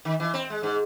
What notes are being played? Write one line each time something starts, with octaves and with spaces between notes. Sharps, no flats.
D#3
E3
C4
G#3
G#2